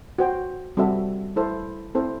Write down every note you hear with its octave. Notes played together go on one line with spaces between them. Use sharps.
F#4 C5 G5
G3 C4 F#4 A4 E5
E4 A4 C5
C4 E4 A4 C5